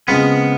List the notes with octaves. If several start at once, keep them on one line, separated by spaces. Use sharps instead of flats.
C#3 F3 G#3 B3 C4